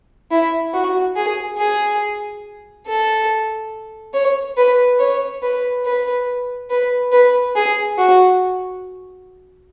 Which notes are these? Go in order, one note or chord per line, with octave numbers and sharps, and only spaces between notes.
E4
F#4
G#4
G#4
A4
C#5
B4
C#5
B4
B4
B4
B4
G#4
F#4